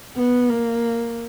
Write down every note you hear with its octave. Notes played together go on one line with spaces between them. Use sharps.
B3
A#3